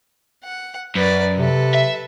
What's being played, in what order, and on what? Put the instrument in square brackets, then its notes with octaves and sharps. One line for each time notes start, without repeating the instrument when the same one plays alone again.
[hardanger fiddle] F#5
[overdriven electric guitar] F#2 [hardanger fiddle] B4 D5
[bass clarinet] C3 [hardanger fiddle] A4 B4
[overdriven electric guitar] E5